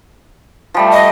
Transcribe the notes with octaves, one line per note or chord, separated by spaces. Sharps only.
F3 G3 A3
D#5